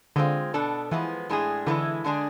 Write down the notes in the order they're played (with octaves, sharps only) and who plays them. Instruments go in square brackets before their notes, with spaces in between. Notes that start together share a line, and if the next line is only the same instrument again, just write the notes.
[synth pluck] D3 [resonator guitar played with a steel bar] G#3 C4 F4
[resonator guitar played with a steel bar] B2 B3 D4 A4
[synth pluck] E3 [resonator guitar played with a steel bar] F3 G#3 B3
[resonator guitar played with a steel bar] A2 G#3 D4 G#4
[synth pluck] D3 [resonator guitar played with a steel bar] E3 G#3 B3 E4 A4
[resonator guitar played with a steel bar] D3 G#3 D4 G#4